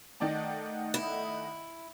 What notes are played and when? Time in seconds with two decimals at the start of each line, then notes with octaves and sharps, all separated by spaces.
0.20 D#3 A3 D5 D#5 F#5 A5
0.94 E4